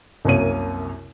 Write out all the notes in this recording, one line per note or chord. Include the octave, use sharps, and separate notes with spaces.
C2 F#2 C3 A#3 C#5 D#7